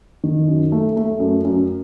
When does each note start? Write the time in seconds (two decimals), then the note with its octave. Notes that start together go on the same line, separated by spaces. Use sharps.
0.24 D#3
0.48 F#2
0.72 A3
0.96 A3
1.19 F#2
1.44 F#2